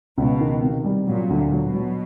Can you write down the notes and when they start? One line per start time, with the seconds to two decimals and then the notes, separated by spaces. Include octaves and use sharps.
0.18 C#2 B2
0.40 D#3
0.62 C3
0.84 G3
1.08 A#2 F#3
1.30 D2
1.52 B2 F#3
1.74 F#3